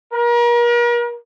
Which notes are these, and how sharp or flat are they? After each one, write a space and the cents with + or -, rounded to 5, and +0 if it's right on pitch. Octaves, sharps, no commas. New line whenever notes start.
A#4 +40